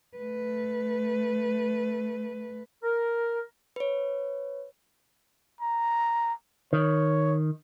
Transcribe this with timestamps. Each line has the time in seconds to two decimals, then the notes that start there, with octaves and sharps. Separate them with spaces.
0.17 A3 B4
2.83 A#4
3.76 B4 C#5
5.61 A#5
6.73 D#3 C#5